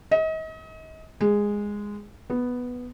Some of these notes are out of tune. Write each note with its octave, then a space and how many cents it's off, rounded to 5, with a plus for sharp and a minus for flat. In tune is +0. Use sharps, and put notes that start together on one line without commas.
D#5 +35
G#3 -10
B3 +0